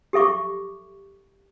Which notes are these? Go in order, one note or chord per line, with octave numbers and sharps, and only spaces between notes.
G4 A4 E5 C#6 D6